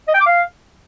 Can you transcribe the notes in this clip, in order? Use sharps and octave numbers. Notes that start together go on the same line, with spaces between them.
D#5
G5
D6
F5